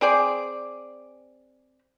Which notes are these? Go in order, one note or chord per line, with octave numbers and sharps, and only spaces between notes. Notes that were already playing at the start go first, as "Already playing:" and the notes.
C4 G#4 D5